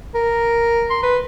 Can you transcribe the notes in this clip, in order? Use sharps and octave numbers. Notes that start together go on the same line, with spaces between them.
A#4
C6
B4